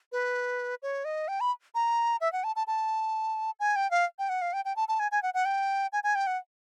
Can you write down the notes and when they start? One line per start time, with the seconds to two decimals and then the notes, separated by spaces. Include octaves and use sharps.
0.12 B4
0.82 C#5
1.05 D#5
1.28 G5
1.40 B5
1.75 A#5
2.21 E5
2.32 F#5
2.44 A5
2.56 A5
2.67 A5
3.60 G#5
3.76 G5
3.91 F5
4.19 G5
4.29 F#5
4.42 F5
4.53 G5
4.65 G5
4.76 A5
4.88 A5
5.00 G#5
5.11 G#5
5.23 F#5
5.34 F#5
5.45 G5
5.93 G#5
6.04 G#5
6.15 G5
6.27 F#5